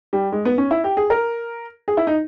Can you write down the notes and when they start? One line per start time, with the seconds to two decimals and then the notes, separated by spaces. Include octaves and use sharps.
0.13 G3
0.32 G#3
0.45 B3
0.58 C#4
0.71 E4
0.84 G4
0.97 G#4
1.10 A#4
1.88 G#4
1.97 E4
2.07 D#4